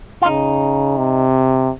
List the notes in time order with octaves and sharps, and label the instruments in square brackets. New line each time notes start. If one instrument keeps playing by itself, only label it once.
[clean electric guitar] F4
[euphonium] C#3 [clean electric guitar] D#4
[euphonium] C3